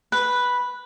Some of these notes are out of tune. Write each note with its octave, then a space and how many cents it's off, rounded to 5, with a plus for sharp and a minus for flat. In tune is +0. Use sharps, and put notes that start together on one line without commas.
B4 -5